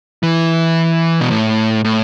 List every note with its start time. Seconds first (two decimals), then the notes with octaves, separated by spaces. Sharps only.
0.23 E3
1.21 B2
1.31 A2
1.85 A2